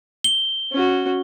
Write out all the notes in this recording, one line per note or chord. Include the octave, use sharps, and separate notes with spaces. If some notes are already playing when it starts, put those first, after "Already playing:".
G7
C#4 F#4